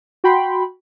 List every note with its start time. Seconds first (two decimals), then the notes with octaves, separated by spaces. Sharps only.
0.24 F#4 G5 B5 C6